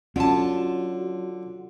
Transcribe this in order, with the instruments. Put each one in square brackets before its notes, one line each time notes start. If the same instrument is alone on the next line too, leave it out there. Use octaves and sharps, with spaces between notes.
[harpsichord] D3 [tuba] F#3 [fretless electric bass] C#4 [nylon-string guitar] F4 A5